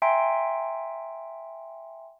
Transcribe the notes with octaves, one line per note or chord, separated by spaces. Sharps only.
E5 G5 G#5 A#5 C6 D7